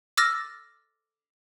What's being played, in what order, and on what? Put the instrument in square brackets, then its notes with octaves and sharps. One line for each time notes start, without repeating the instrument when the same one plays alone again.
[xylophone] D6 E6 F6 A6 A#6